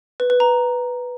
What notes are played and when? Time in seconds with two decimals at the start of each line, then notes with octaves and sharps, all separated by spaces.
0.20 B4
0.30 B4
0.40 A#5